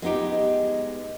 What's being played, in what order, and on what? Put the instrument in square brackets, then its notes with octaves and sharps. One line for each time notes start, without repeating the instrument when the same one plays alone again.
[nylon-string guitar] G#3 B3 D#4 G4